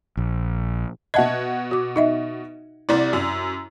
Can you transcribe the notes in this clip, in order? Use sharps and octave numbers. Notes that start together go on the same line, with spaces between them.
A#1
B2 D#5 E5 F#5 A5 G#6
F#4 D6
D#4 D#5 E5
C2 C3 E4 D5
F#2